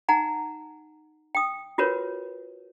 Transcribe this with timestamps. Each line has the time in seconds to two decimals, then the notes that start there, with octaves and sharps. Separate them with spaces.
0.09 D#4 F#5 G#5 A#5
1.35 G5 D#6
1.78 F4 F#4 A#4 B4 C#5